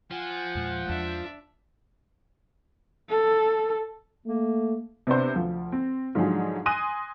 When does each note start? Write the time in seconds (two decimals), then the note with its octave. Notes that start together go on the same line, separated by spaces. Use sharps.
0.11 F3 F#5 G#5
0.55 E2 A#2 G#3
0.86 E2 G#3 D4 E5
3.10 A4
4.26 A3 A#3
5.07 C3 B3 D4 C5
5.35 D2 F3
5.72 C4
6.15 G#2 D3 F3 F#3 D#4 G#4
6.66 G#5 C6 D#6 F#6 A#6 D#7